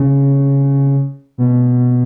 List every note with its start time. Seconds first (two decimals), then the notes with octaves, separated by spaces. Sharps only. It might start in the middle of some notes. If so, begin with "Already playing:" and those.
Already playing: C#3
1.38 B2